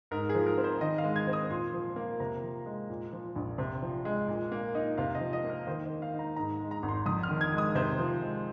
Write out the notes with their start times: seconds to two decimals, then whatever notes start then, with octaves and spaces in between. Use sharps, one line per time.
0.11 G#2 A#4
0.29 G#4
0.35 F3
0.46 A#4
0.57 C4
0.64 C5
0.81 D#3 D#5
0.98 F5
1.04 G#3
1.16 G#6
1.27 C4
1.33 D#6
1.50 A#2 C6
1.73 F3
1.96 A#3
2.20 C3 A#5
2.43 F3
2.66 G#3
2.90 A#2
3.13 F3
3.36 A#1
3.58 C3
3.82 F3
4.05 G#3
4.28 A#2
4.52 A#3
4.75 D#4
4.98 C3 F5
5.15 D#5
5.20 F3
5.33 D#5
5.44 A#3
5.50 A#4
5.67 D#3 C5
5.85 D#5
5.90 A#3
6.02 F5
6.14 D#4
6.19 A#5
6.36 G#2 A#5
6.60 G#3
6.71 A#5
6.83 G#1
6.89 C6
7.06 F2 D#6
7.23 F6
7.29 D#3
7.41 G#6
7.52 G#3
7.58 D#6
7.75 C3 C5
7.99 F3
8.22 G#3